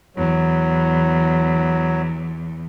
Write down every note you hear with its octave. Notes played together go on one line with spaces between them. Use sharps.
E2 F#3